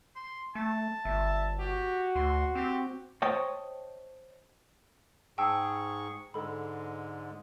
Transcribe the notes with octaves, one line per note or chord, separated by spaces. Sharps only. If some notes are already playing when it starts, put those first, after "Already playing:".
C6
A3 A5
G1 E5
F#4 G4
D2 C6
C4 G4
C5 C#5 D#5 G5 A5
G#2 G#4 G5 A5 C#6 E6
G#2 D3 G#3 A4 B5